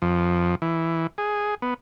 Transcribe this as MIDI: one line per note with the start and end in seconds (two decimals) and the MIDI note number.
0.02 0.55 41
0.62 1.07 52
1.18 1.55 68
1.62 1.74 59